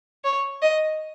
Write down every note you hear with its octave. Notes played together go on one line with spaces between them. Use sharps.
C#5
D#5